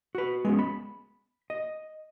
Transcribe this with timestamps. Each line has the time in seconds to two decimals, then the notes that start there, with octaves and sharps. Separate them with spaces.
0.15 F#4 B4
0.45 G#3 B3 C#4
0.59 B5
1.50 D#5